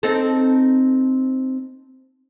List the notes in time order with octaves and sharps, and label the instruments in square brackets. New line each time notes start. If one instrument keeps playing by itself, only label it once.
[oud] C4 D#4 A4